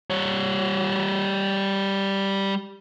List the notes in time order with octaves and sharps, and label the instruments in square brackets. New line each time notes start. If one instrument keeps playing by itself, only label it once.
[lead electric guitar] G3 C#5